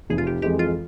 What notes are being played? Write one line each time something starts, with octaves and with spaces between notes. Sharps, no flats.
F1 G#4
F4
G4
F2 E3 G#3 G4
F4